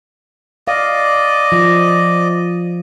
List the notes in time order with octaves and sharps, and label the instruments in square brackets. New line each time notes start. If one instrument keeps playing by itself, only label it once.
[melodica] D5 D#5 [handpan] F5
[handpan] F3